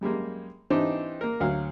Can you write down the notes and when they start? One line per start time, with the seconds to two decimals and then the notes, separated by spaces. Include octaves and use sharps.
0.01 F#2 G3 G#3 A#3
0.70 E3 C4 D4 D#4 G4
1.21 A#3 A#4
1.40 D2 F#3 F5